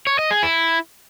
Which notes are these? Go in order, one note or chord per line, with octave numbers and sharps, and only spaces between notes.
C#5
D#5
G#4
E4